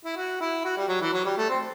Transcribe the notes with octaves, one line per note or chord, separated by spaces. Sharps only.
E4
F#4
E4
F#4
G3
F#3
E3
F#3
G3
A3
C4